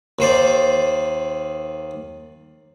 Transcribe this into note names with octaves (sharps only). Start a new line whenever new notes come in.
D#2 D#3 C5 D5